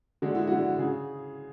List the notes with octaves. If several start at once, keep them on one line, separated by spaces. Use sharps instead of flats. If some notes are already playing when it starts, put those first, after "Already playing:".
D3 G#3 F#4
E4
D3 G#3 F#4
C#3 G#4